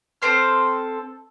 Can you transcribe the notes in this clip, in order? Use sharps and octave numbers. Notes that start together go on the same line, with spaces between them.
C4 A4 C5 F6